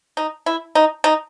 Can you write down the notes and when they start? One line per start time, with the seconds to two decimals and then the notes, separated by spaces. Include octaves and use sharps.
0.17 D#4
0.46 E4
0.75 D#4
1.04 D#4